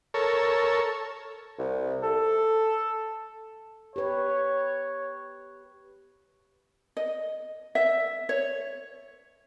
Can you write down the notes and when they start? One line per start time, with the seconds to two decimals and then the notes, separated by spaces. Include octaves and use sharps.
0.14 A4 A#4 C#5
1.58 C2
2.03 A4
3.96 G4 B4 C#5
6.97 D#5
7.75 E5
8.29 C#5